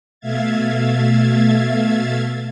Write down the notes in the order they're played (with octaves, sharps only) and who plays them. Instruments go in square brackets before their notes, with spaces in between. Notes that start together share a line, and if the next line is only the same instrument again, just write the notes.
[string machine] B2 A3 E5 F5 G#6 A6